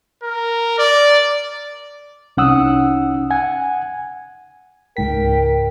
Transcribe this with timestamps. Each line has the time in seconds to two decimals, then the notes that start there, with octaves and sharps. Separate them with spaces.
0.23 A#4
0.79 D5
2.37 C2 C#4 D#4 F#5 D#6 E6
3.30 F#5 G#5 G#6
4.97 C#2 G#2 A#4 G5 B6